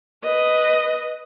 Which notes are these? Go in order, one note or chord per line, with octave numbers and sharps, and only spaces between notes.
B4 D#5